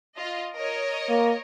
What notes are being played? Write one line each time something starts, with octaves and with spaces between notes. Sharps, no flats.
F4 D#5
A#4 C#5 D#5
A#3